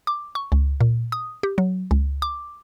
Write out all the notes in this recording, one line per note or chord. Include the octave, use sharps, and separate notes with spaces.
D6
C#6
C#2
A#2
D#6
G4
F#3
C#2
D6